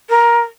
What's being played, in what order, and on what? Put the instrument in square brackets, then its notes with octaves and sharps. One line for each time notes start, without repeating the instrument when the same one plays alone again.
[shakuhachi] A#4